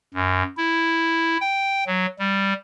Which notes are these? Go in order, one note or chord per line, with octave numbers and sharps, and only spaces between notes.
F#2
E4
G5
F#3
G3